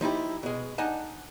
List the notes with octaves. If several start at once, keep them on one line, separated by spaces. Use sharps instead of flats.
F3 D#4 E4 G4
B2 G#3
D4 D#4 D#5 F#5 G#5 A5